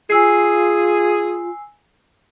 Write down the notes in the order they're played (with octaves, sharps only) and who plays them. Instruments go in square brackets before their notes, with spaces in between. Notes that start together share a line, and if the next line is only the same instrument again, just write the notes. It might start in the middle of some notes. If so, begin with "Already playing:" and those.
[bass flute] F4 [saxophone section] G#4 [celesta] G#5 E6 C7